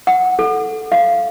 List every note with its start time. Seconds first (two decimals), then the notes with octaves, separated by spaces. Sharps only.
0.07 F#5
0.39 A4
0.92 F5